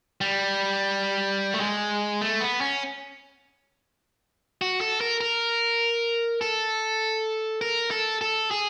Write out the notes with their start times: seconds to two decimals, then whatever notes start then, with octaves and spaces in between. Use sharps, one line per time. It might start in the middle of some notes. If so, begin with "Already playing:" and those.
0.21 G3
1.54 A3
1.60 G#3
2.21 A3
2.41 B3
2.61 C#4
4.61 F#4
4.81 A4
5.01 A#4
5.21 A#4
6.41 A4
7.61 A#4
7.91 A4
8.21 A4
8.51 G#4